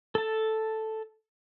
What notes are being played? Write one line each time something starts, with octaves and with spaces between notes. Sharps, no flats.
A4 A5